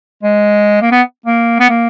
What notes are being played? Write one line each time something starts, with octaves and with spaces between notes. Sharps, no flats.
G#3
A#3
B3
A#3
B3
A#3